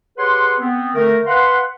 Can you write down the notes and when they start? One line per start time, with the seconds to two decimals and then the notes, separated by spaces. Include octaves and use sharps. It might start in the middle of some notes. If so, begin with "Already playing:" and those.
0.17 G4 G#4 B4 C#5 F#5 C6
0.60 B3 C4
0.95 D3 D#3 A3 A#4
1.27 B4 F5 F#5 C6